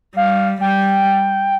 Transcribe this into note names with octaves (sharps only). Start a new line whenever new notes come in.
G3 F5
G3 G5